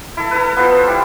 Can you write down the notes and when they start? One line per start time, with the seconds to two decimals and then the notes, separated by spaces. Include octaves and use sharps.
0.17 E4 A4
0.31 A4 B4
0.57 B3 F4 C5
0.72 C5
0.87 G3 E4